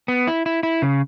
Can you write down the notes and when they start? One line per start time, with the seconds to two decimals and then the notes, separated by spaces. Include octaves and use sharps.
0.08 B3
0.27 E4
0.46 E4
0.63 E4
0.82 C#3